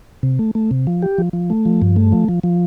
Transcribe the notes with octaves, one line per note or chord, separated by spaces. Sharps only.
C3
A3
A3
C3
F3
G4
F3
F3
A3
F3
G2
A3
F3
F3
F3